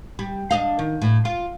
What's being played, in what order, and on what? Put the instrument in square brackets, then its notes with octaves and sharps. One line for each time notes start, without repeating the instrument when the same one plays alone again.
[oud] G3
D4 D#5 F5
D#3
A2
F4